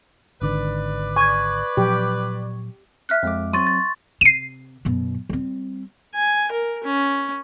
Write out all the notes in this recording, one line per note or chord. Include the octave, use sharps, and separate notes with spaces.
G#1 D3 D#3 B4 D5
G#5 C#6 G#6
A#2 F3 F#3 G4
E5 F6 F#6
F2 G#3 D6
F#3 C4 C6 C#6 A6 D#7
A6
C3 C7 D#7
F#2 B2
G3 C4
G#5
A#4
C#4